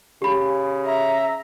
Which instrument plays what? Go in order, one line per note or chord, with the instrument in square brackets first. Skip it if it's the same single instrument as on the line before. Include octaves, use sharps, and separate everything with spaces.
[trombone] C#3 [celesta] G4 B5
[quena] E5 [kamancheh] A#5